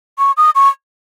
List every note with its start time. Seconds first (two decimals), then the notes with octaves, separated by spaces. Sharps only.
0.19 C#6
0.37 D#6
0.55 C#6